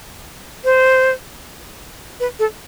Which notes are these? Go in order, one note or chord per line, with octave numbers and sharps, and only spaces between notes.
C5
B4
A4